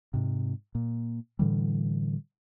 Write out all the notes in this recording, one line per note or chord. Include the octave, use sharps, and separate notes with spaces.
G#2 C3
A#2
A2 D3 E3 G3